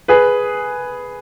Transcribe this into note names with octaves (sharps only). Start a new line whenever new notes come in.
G#4 B4